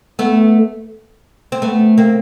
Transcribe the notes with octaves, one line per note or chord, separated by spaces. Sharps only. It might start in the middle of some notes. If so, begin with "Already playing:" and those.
A3 B3
C4
A3 B3
A#3 C4